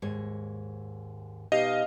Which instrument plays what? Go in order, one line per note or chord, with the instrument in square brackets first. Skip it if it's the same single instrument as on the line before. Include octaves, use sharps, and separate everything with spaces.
[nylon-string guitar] D#2 G#2 C#5
[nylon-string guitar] B2 D#4 G4 [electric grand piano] D#5 [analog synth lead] F5